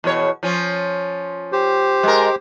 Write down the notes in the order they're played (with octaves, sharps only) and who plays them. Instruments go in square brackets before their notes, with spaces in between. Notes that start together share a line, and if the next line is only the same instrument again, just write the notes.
[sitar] E2 B2 C#5
F3 C#4
[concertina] G4 C5
[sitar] G#3 A#4